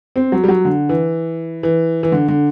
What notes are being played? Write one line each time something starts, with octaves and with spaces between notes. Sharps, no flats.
C4
F#3
G3
F#3
D3
E3
E3
E3
D3
D3